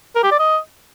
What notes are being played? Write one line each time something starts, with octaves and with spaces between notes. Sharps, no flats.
A#4
G4
D5
D#5